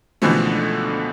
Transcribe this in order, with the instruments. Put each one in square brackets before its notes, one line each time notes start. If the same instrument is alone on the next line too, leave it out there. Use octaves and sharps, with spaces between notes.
[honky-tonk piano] C#2 B2 D3 E3 F3 A3